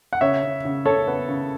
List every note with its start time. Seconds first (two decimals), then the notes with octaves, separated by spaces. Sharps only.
0.13 F#5
0.21 C#3 C#5 E5
0.43 C#3
0.65 C#3
0.86 C#3 A4 C#5
1.07 B3
1.28 C#3